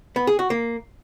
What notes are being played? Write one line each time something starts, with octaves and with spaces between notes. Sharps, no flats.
B3
G#4
F#4
A#3